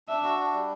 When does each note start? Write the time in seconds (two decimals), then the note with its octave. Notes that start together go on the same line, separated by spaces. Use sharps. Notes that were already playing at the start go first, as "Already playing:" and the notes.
0.08 D4 E5
0.23 F#4
0.39 D4
0.54 G3